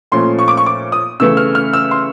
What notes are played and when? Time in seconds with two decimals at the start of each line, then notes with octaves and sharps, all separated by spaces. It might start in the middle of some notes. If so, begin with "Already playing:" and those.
0.12 A#2 F3 A3 C#4 C6
0.39 C#6
0.48 D6
0.57 C#6
0.66 D6
0.92 D#6
1.20 C#3 E3 A3 E6
1.37 F6
1.55 F6
1.73 E6
1.91 C6